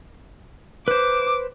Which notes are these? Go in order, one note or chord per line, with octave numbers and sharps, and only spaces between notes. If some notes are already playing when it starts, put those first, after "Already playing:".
B4 C5 D6